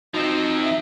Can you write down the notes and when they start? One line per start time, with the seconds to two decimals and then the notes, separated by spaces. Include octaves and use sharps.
0.14 F3 C4 D#4 F#4 D#5
0.64 E5